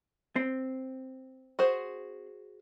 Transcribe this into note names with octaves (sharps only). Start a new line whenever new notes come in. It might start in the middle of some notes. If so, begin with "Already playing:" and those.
C4
F#4 G#4 C5